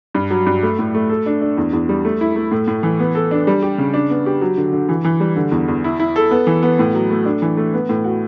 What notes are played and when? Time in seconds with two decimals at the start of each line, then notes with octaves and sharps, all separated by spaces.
0.15 G2
0.30 F#3
0.46 G2
0.63 A3
0.79 A2
0.95 A3
1.09 A4
1.26 D4
1.42 D4
1.57 E2
1.73 E2
1.89 G3
2.05 A3
2.21 E4
2.36 A3
2.51 A2
2.68 A2
2.83 E3
2.99 B3
3.15 A4
3.31 D4
3.47 G3
3.63 G4
3.78 C#3
3.94 D4
4.10 B3
4.26 G4
4.41 F#3
4.57 D3
4.73 D3
4.89 E3
5.05 E3
5.20 G3
5.36 D3
5.52 E2
5.68 E2
5.84 E4
6.00 E4
6.16 A4
6.31 B3
6.47 E3
6.63 B3
6.79 A2
6.94 F#3
7.10 A3
7.25 D4
7.42 E3
7.57 A3
7.74 B3
7.89 A2
8.04 F#4